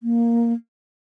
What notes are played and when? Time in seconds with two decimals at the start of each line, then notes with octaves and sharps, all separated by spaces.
0.03 A#3